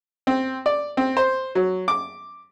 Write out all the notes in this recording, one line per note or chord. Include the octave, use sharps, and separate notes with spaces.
C4
D5
C4
C5
F#3
D6